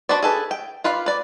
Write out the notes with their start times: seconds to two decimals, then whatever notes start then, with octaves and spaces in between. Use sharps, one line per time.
0.09 D4 F#4 B4 C5 D5
0.23 G#4 A4 B4
0.51 G5
0.84 F4 B4 D5 F5
1.06 B4 D5